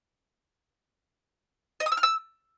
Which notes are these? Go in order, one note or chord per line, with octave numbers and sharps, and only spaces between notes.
D#5
D#6
E6
F6
E6